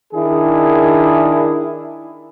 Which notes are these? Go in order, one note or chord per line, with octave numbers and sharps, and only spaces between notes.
D#3 D4 E4 G#4